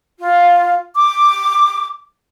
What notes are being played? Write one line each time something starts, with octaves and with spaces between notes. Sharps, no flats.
F4
D6